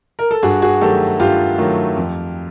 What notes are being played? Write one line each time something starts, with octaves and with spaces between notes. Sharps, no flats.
A#4
A4
G2 F#4 G#4
F#4 G#4
D#3 F#3 A3 G4 A4
G2 F4 G4
D#3 F#3 A3
F2